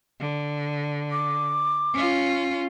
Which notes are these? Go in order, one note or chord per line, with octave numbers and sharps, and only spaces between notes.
D3
D6
C#4 F4